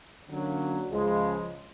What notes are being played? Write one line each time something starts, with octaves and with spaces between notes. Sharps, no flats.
D3 F#3 A#3 C#4
C#2 C#3 F3 G#3